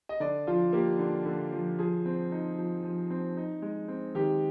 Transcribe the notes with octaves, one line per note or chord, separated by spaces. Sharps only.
D#5
D3 D5
F3 F4
A#3 G4
D3
D3
F3
F3 G#4
C4
D#4
F3
F3
C4
D#4
G#3
C4
D#3 G4